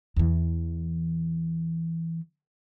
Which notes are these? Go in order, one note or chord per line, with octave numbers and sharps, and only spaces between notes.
E2 E3